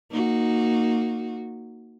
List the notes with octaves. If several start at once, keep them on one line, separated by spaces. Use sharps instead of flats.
A#3 D#4 F#4